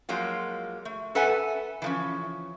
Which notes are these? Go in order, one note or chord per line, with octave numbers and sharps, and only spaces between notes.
F3 F#3 G#3 A#3 F4
A3
A4 B4 E5 F#5 G#5 A5
E3 F3 C#4